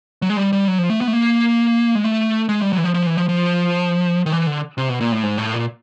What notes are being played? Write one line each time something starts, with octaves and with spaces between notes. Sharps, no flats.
F#3
G#3
G3
G3
F#3
F3
A3
B3
A3
A#3
G#3
A3
G#3
G3
F#3
E3
F3
F3
E3
F3
F3
D#3
E3
D3
C3
B2
A#2
A2
G#2
A2
A#2